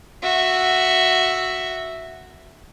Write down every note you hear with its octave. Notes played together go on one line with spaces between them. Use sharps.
F#4 E5